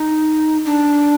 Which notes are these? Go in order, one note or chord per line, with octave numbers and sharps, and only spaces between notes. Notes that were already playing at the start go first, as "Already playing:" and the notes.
Already playing: D#4
D4